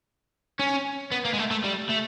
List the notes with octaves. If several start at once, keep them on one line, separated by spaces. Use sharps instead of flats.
C#4
B3
A#3
G#3
A3
A3
G3
A3